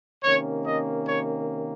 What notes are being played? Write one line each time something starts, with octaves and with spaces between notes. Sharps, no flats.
C3 D#3 A#3 C#4 C#5
D#5
C#5